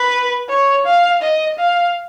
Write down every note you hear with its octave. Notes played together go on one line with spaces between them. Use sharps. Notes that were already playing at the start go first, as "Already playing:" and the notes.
Already playing: B4
C#5
F5
D#5
F5